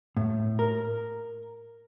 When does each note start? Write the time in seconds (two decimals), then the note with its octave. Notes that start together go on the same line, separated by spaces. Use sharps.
0.17 A2
0.59 A#4